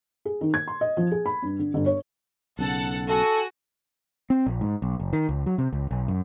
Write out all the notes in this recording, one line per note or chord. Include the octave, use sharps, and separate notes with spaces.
G#4
D#3
G#6
C6
D#5
F3
G#4
B5
G2
D3
G1
C#5
B1 C#3 A4 F#5 A5
F#4 A4 G#5
C4
A#1
G#2
B1
F#1
D#3
C#2
F#3
C3
C#2
B1
F#2